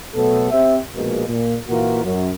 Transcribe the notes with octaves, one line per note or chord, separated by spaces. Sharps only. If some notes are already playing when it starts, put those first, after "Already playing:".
B2 F#3 A3 B3 A4
C4 G4 C5 E5
A#1 B2 G#3 A#3
A#2
A#2 E3 A#3 F4 F#4 A#4
F#2